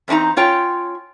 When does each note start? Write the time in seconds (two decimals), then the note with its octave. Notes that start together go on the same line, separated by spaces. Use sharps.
0.08 E2 C4 D4 D#4 A#5
0.37 C#4 F4 C#5 G5